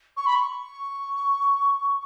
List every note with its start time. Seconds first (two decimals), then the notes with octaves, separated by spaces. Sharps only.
0.17 C#6
0.26 B5
0.36 C#6